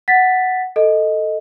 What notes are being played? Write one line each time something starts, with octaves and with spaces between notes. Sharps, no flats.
F#5 A6 B6
A4 D#5